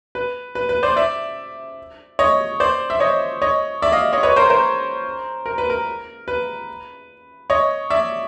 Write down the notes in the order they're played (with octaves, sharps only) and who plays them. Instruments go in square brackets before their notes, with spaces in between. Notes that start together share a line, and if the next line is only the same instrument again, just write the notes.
[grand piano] B4
B4
B4
C5 D5
D5 E5
C#5 D#5
C5 D5
E5
C#5 D#5
C#5 D#5
D5 E5
D#5 F5
C#5 D#5
B4 C#5
A#4 C5
A#4 C5
A#4
B4
A#4
B4
C#5 D#5
D5 E5